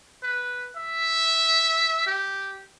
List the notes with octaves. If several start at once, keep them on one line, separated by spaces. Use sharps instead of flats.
B4
E5
G4